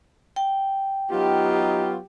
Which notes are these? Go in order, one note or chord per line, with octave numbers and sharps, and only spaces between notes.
G5
F#3 B3 D#4 F4 G4